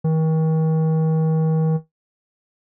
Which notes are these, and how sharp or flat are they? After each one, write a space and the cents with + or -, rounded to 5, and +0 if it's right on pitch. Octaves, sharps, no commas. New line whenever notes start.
D#3 +40